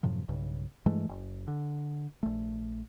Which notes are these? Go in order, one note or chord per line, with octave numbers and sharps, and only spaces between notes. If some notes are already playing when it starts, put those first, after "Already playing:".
F#2 A2 C3 F3
B1 G2 C#3
G2 E3 G#3 A3
F#1
D3
A#1 A3